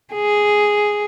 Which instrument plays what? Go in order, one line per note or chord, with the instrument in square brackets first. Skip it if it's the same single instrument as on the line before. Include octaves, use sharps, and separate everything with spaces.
[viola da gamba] G#4